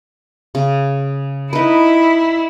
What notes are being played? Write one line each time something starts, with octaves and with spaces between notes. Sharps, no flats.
C#3
D#4 E4 B4